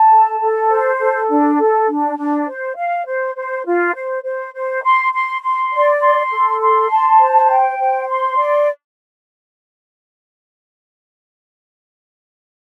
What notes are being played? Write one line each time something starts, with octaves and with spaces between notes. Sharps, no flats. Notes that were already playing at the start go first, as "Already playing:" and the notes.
Already playing: A5
A4
A4
C5
A4
D4
A4
D4
D4
C5
F5
C5
C5
F4
C5
C5
C5
C6
C6
C6
D5
C6
A4
C6
A5
C5
G5
C5
C6
D5